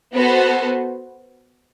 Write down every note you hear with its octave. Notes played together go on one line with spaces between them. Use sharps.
B3 F#4 A4 C5